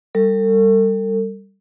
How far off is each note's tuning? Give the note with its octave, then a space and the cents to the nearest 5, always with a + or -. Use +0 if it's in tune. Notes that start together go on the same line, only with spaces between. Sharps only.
G3 +0 A4 +40